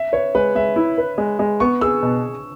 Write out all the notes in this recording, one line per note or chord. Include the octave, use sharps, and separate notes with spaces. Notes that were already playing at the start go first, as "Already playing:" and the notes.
Already playing: E5
B4 C#5
G#3 B4
G#3 E5
E4
B4
G#3
G#3
B3 C#6
G#4 E6
B2